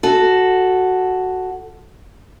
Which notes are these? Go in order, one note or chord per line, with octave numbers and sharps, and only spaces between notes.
F#4 A4